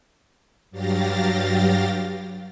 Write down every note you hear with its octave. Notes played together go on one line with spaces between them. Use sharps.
G2 F#3 G4 F5 A6 A#6